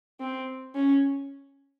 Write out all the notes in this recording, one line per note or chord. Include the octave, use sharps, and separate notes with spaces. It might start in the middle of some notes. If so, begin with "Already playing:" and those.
C4
C#4